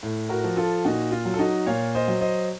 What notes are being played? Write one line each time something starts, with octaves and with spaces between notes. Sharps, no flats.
A2
F#4 A#4
F3
F4 A4
A#2 D#4 F#4
F4
F#3
A4
D#4 F#4
A#2 C#5 F5
C5 D#5
F#3
C5 D#5